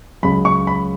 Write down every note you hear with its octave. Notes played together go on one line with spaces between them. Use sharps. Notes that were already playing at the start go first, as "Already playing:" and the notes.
C#2 C#3 F#3 B5
C#6
B5